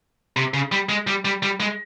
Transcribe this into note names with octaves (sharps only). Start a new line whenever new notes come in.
C3
C#3
G3
G#3
G3
G3
G3
G#3